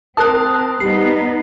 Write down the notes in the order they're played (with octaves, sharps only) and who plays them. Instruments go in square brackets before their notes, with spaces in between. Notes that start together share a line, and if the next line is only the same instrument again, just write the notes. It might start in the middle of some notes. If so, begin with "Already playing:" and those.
[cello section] C4 [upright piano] A#4 A5 [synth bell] D#6 F#6
[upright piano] G3 [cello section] B3 D#4 [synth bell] C7